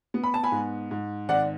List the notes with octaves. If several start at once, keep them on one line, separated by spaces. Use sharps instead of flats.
B3
B5
A5
G#5 B5
G#2
G#2
G#1 D5 F#5